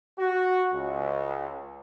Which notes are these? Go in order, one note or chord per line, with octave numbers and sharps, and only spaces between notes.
F#4
C#2